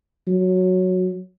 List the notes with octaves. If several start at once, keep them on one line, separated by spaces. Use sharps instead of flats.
F#3